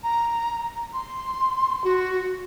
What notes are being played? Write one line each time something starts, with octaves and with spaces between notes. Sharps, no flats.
A#5
C6
F#4